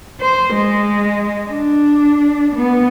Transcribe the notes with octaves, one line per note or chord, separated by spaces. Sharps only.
C5
G#3
D4
B3